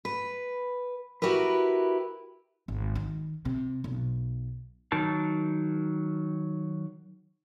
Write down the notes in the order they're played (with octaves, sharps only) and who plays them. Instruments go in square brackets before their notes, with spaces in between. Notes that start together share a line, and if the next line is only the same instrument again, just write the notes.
[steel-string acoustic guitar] B4
E4 F#4 G4 A#4 B4
[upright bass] G#1
D#3
C3
B1
[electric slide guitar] D#3 F#3 D#4 A#4 A5